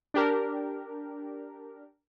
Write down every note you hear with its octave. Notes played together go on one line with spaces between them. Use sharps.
D4 G4 A#4